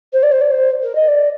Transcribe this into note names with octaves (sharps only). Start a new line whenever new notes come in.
C5
D5
C5
D5
C5
A#4
D#5
D5